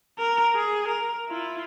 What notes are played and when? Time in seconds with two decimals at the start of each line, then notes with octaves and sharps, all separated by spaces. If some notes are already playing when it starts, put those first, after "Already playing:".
0.18 A#4 A#5
0.56 G#4
0.88 A#4
1.28 E4 F4